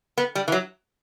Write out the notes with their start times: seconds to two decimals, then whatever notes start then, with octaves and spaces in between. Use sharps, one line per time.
0.18 B3
0.35 G3
0.48 E3
0.52 F#3